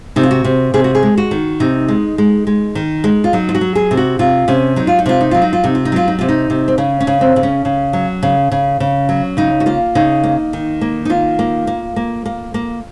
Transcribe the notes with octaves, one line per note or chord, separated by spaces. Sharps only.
C3 D#4
F4
F#4
C3
C3 G#4
F#4
G#4
G#3
F#4
D#3
C3 D#4
G#3
G#3
G#3
D#3
G#3
F4
F#3 D#4
F4
F#4
F#3
G#4
C3
F#4
C3 F4
C3 C#4
F#3 D#4
F4
D#4
C3 F4
D#4
F#3 F4
D#4
F4
C3 D#4
F4
D#4
F#3 F4
D#4
C3 F4
D#4
C3
C4
C#3 C#4
C#4
C#3
C4
C#3
C#4
C#3
F#3
C#3
C#3
C#3
F#3
C#3 D#4
F#4
A#3 F4
C#3 D#4
A#3
D#3
A#3
D#4
D#3 F4
A#3
A#3
A#3
A#3
A#3